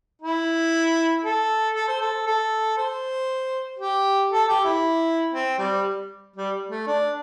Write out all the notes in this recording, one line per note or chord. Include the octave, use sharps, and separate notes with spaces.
E4
A4
A4
C5
A4
A4
C5
G4
A4
G4
E4
C4
G3
G3
A3
D4